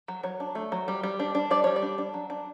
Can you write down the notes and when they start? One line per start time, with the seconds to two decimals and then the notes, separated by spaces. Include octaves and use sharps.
0.08 F#3
0.23 F#3 C#5
0.40 D4
0.55 A3
0.72 F#3
0.88 G3
1.03 G3
1.20 D4
1.35 D4
1.50 G3 D5
1.64 G3 C#5
1.76 D5
1.82 D4
1.98 D4
2.14 F#3
2.30 D4